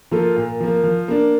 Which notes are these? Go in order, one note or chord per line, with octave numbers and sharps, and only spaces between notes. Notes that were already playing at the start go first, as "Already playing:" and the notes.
F3 A#3 F4 A4
A#2
F3 A#3
F3
A#3 D4